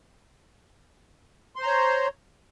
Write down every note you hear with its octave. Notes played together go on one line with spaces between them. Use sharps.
C5 C#5 A#5 C6